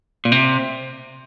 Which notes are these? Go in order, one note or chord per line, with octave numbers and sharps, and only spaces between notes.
A#2
C3